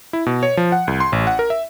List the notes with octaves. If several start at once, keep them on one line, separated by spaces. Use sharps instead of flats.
E4
B2
C#5
F3
F#5
C2
C6
A1
F#5
A#4
E5